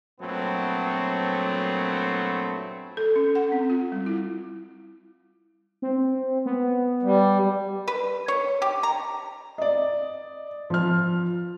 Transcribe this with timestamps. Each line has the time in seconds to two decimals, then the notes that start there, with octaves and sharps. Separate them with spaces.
0.20 G2 A#2 F#3 A3 B3 C4
2.97 A4
3.16 C#4
3.35 F#5
3.52 C4
3.70 F4
3.92 G3
4.06 E4
5.82 C4
6.46 B3
7.03 G3
7.88 B4
8.28 C#5
8.62 G4
8.83 A#5
9.58 D5 D#5
10.70 F3 F6